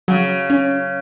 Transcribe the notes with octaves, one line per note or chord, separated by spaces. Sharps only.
C#3 F#3
C#4